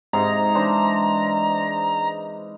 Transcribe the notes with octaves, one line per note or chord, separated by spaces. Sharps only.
G#2 C3 D#4 A#5
E3 D4 C5